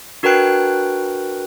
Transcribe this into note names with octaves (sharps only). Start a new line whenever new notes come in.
D4 F#4 A#4 B4 G5 F#6